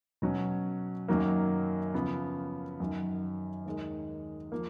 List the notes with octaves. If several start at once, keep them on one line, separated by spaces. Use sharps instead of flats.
B2 F#3 C#4
F#2 D#3 F#3 A#3
C#3 F3 B3
F#2 D#3 F#3
D#2 D#3 G#3
F3 A#3